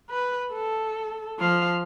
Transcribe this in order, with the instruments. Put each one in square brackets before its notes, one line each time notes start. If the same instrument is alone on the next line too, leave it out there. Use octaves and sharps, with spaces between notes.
[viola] B4
A4
F3 F5